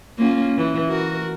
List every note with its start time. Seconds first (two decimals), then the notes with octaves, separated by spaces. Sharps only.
0.18 A#3 C#4 F4
0.58 E3
0.89 F#4 A#4